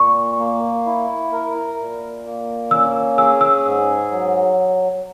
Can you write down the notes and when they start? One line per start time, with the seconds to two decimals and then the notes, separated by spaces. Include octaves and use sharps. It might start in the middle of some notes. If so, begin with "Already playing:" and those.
Already playing: A#2 C#6
0.39 A#3
0.86 E4
1.32 A#4
1.79 A#2
2.25 A#3
2.71 C#4 E6
3.18 G#4 E6
3.41 E6
3.65 G#2
4.11 F#3